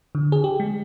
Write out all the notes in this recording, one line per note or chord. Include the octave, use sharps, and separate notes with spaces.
D3
G#4
G4
G#3